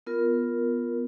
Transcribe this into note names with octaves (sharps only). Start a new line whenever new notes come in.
B3 F4 A#4